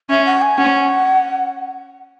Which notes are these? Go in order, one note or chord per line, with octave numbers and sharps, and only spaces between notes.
C#4 E5
F#5
G#5
C#4 F#5